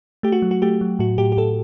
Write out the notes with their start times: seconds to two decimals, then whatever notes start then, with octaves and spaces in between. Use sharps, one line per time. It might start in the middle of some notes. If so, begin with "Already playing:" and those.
0.23 A3 G4
0.32 F#4
0.42 F#3
0.51 F#4
0.62 A3 G4
0.81 F#3
0.99 A2 F#4
1.18 A2 G4
1.32 G4
1.37 A2 A4